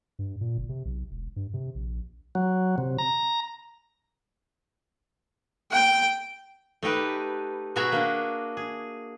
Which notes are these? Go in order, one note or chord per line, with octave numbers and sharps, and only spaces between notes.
G2
A#2
F#1
C3
B1
E1
G2
C3
A#1
F#3
C3
A#5
G5
A3 D#4 G4 B4
B2 F#4 G#4 E5 G#5 A#5
A#3 D4
G#4